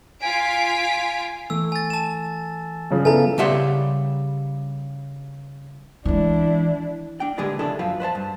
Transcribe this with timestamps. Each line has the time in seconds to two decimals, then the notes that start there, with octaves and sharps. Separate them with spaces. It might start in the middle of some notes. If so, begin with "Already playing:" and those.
0.22 F4 F5 G#5 B6 D7
1.50 E3 A3 E6
1.72 G#5 A6
1.90 A5 E7
2.91 G2 C#3 F3 F#3
3.05 B3 E4 A4 F5 G#5 A#5
3.38 C#3 G3 E5 F#5 C6
6.05 E3 G#3 D4 E4
7.20 D4 G5
7.38 D3 G#3 G4 G#4 B4 D5
7.59 C#3 F3 G#3 D4 E4 A4
7.79 F#2 F3 F4 B4 F5
8.00 B4 C5 E5 A5
8.15 G2